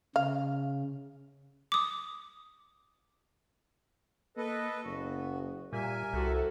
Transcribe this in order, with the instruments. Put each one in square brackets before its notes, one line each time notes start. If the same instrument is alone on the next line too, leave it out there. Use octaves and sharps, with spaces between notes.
[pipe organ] C#3 [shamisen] F5
[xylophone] D6 D#6
[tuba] A#3 [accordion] A4 B4 D#5
[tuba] F#1 [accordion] B3 F#4
[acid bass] A#2 [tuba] G3 [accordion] A#4 E5 G#5
[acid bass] C2 [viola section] F#4 A4